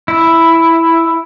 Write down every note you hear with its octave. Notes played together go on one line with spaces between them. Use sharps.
E4